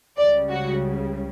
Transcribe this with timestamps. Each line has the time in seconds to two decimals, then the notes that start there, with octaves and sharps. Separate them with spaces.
0.18 C#2 C#3 G3 D5
0.50 F#4